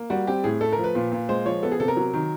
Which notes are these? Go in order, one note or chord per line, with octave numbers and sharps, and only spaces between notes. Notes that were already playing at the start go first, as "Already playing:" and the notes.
Already playing: A#3
G3 F#4
C4 G4
A2 G#4
A3 A4
A#4
F3
B4
A#2
A#2
G#3 C5
F3 C#5
B3 A4
G#4
C3 A4
A#4
F#3
D#3